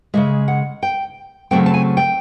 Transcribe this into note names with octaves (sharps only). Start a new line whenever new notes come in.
C#3 F3 G#3 E5
F#5
G5
C#3 F#3 A3 C4 G5
A5
G#5
G5